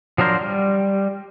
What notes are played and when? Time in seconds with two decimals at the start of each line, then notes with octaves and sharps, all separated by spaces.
0.18 F3 F#3 D4 A#4 C5
0.41 G3